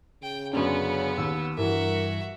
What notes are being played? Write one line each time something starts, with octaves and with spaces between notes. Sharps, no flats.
C#3 G5
F#2 D3 B3 C#4
D#2 E6
G2 E3 F#4 A#4 E5